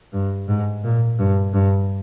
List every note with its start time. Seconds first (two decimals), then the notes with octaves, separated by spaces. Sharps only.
0.13 G2
0.48 G#2
0.84 A#2
1.18 G2
1.53 G2